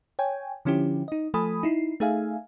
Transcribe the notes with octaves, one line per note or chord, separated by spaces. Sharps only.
C#5 G5 G#5
D3 F3 C#4 E4 G4
D#4 D#5
F3 A3 A4 G#5 B5 D#6
D#4 E4 C7
A3 D#4 G#4 E5 F5 G#5